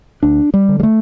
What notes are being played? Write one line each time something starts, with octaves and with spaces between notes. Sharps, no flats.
D2 D4
G3
D3
G3
A3